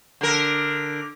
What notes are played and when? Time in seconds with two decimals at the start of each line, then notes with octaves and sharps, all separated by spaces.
0.21 D3 A#4